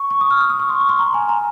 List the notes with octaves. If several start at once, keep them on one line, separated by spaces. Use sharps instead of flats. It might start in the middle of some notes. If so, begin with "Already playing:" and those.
Already playing: C#6
C#6
D#6
F6
F6
D#6
C#6
C6
C#6
C6
A#5
G#5
A#5